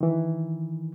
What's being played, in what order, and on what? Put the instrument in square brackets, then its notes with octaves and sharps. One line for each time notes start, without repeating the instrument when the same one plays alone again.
[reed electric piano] D#3 E3